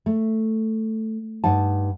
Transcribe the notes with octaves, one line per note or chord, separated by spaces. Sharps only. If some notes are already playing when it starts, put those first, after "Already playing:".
A3
G2 D#4 F#5 A5